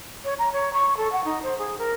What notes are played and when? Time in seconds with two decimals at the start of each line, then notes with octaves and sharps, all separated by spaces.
0.24 C#5
0.39 A#5
0.53 C#5
0.74 C#6
0.97 A4
1.12 F#5
1.25 D#4
1.43 C5
1.58 G#4
1.78 A#4